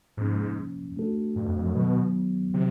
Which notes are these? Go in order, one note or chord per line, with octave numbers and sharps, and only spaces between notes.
G#2 C3 F3 A#3 C#4
A3 D4 F#4 A4
G2
F2
F2
F#2
B2 D#3 F#3 B3
C3 D#3 F#3